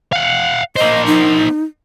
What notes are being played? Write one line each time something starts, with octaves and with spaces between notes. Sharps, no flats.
F5 F#5
A#3 C5 D#5
D#4